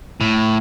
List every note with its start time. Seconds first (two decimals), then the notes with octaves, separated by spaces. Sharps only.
0.20 A2